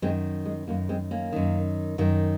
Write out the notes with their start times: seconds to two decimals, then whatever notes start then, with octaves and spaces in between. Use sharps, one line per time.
0.02 F#2 D#3 G#3 C4
0.45 G#3
0.67 F#2 D#3 A#3
0.89 G#3 C4
1.11 A#3 C#4
1.32 F#2 D#3
1.98 F#2 D#3